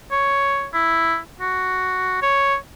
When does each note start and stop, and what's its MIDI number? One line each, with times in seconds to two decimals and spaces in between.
0.12 0.67 73
0.74 1.17 64
1.41 2.22 66
2.22 2.55 73